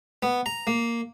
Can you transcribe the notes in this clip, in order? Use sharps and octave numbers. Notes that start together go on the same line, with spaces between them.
B3
A#5
A#3